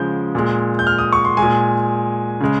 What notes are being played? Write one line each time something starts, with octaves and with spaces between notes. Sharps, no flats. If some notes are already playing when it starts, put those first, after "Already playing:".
Already playing: C#3 F3 G#3 G6
A#2 G#3
G6
F6
D#6
C#6
C6
A#2 G#3 G#5
C#3 G#3